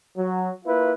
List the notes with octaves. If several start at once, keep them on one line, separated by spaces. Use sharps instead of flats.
F#3
A#3 E4 F4 B4